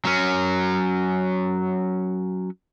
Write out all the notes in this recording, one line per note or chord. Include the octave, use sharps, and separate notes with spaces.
F#3 C#4